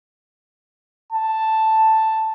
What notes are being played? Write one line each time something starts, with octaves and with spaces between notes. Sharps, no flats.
A5